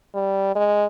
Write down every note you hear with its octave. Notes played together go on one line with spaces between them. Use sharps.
G3
G#3